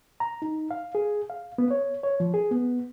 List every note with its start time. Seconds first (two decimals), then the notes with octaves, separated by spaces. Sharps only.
0.20 A#5
0.42 D#4
0.71 F5
0.95 G#4
1.30 F5
1.58 B3
1.71 C#5
2.03 C#5
2.20 F3
2.34 G#4
2.51 B3